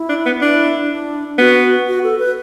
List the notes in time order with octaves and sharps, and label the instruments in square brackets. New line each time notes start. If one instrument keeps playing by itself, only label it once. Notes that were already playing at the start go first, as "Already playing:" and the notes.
Already playing: [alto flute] E4
[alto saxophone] D4
B3
[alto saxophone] D4 [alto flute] E4
[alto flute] D4
[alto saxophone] B3 [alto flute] F#4
[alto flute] F#4
A4
B4